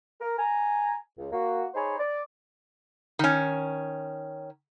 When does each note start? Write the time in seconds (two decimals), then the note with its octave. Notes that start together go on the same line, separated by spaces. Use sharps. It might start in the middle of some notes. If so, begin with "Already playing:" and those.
0.20 A#4
0.38 G#5 A#5
1.18 C#2
1.31 A#3 F#4
1.74 D#4 G#4 C5 C#5 B5
1.98 D5
3.19 D#3 C#4